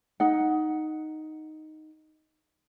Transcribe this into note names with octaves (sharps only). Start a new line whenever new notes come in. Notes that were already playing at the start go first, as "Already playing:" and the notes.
D#4 F#5